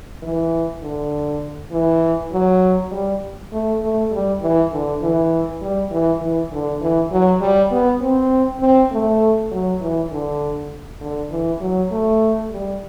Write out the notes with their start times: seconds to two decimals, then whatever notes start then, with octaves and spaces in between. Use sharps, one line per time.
0.22 E3
0.82 D3
1.72 E3
2.32 F#3
2.92 G3
3.52 A3
3.82 A3
4.11 G3
4.42 E3
4.72 D3
5.02 E3
5.61 G3
5.91 E3
6.21 E3
6.51 D3
6.81 E3
7.11 F#3
7.41 G3
7.71 B3
8.01 C4
8.61 C4
8.92 A3
9.51 F#3
9.81 E3
10.11 D3
11.01 D3
11.31 E3
11.61 F#3
11.91 A3
12.51 G3